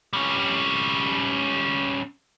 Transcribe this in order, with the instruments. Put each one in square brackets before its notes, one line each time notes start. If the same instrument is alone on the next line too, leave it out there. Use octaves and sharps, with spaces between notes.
[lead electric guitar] G3 C#4